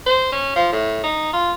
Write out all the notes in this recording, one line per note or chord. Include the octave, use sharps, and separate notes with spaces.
C5
C#4
F3
A2
D#4
F4